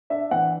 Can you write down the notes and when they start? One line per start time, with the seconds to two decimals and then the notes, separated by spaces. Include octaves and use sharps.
0.10 D4 E5
0.31 E3 F#5